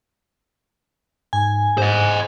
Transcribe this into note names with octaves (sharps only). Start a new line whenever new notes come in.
G#2 G#5
G#2 C5 D#5